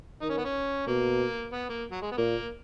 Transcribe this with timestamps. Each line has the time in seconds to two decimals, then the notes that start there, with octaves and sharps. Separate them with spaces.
0.22 D#3 D#4
0.30 C#4
0.38 B3
0.45 C#4
0.87 B2 A#3
1.53 B3
1.69 A#3
1.91 F#3
2.02 G#3
2.12 B3
2.17 A#2 A#3